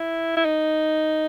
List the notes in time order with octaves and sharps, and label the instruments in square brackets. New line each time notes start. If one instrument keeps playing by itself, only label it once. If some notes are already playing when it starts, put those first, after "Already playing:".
Already playing: [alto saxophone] E4
E4
D#4